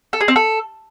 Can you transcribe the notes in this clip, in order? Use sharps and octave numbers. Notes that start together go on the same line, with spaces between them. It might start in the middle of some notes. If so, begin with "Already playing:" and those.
A4
G#4
C4
A4